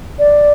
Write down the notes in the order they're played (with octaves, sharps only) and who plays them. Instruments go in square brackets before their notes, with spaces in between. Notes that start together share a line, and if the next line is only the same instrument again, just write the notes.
[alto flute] D5